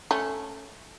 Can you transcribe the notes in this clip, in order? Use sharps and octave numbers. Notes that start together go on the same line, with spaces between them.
A3 C#4